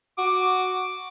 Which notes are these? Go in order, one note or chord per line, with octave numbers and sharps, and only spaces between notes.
F#4 D6